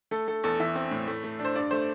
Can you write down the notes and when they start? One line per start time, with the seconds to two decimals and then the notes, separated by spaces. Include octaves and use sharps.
0.11 A3 A4
0.28 A3 A4
0.44 E2 A4
0.60 E3 E5
0.75 C4
0.91 A2
1.07 A3
1.24 A3
1.39 D4
1.45 C5
1.55 G2 D5
1.71 A3 C5